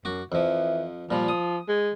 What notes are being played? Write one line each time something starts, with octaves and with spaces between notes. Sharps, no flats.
F#2 F#4 D6
F2 E3 F3
A#2 F3 G3
D#6
G#3